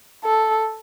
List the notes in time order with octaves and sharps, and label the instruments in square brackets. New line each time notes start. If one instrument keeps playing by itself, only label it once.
[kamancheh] A4